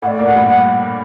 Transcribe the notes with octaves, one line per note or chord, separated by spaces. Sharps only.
A2 A3 D5 F#5
A#2 A#3
F#5
G2 G3
F#5